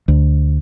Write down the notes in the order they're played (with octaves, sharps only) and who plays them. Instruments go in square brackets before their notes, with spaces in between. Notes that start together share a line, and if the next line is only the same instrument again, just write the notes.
[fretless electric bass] D2